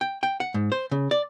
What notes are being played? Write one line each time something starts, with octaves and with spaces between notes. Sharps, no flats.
G5
G5
F#5
G#2
C5
C#3
D5